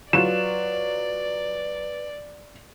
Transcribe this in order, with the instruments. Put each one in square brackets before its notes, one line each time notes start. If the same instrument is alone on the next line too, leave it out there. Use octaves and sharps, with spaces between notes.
[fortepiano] F#3 F4 [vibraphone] B4 [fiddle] D5 [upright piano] E7